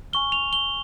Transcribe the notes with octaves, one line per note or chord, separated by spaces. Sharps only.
G#5 C#6 F6 G7
F7
G7